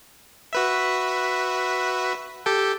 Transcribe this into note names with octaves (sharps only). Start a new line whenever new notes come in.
F#4 B4 E5
G4 A4 G5